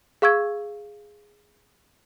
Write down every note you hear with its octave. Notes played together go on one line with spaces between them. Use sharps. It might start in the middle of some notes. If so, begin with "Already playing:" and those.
G#4 F5 C#6 E6 G#6